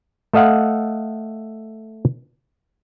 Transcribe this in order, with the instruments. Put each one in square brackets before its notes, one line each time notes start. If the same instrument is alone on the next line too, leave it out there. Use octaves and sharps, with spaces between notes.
[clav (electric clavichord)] A3 A4 D#5 F5 F#5